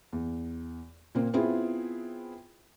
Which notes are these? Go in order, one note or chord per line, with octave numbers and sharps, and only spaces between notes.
E2
A#2 A#3 C4
B3 C4 E4 F4 G#4